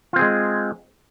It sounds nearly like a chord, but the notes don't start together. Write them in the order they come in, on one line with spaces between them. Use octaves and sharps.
F4 C4 G#4 G#3